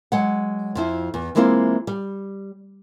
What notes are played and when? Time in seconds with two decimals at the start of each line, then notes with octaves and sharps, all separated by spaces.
0.12 F#3 G#3 F#5
0.75 F2 F3 E4
1.14 E2
1.35 E3 G#3 A#3 C4 E4 F4
1.87 G3